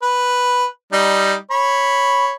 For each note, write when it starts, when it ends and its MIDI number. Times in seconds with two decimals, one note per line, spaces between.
0.02 0.65 71
0.93 1.34 55
0.93 1.34 63
1.51 2.33 73
1.51 2.33 83